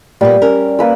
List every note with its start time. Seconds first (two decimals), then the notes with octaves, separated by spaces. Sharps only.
0.21 A#2 G3 A#3 B3
0.42 C#4 A#4
0.79 A#3 B4 E6